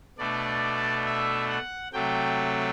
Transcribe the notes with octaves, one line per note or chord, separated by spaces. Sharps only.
B2 A3 D4 D5
E5
F#5
C3 F#3 A3 G5